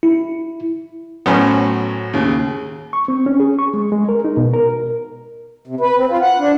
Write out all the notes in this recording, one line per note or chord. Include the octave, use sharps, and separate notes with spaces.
E4
A2 F#3 B3 C#4 C5
D#2 C#3
C#6
C4
C#4
G#4
C#6
G#3
G#3
A#4
D#4
B2
A#4
C3
B4
C4
F4
F#5
D4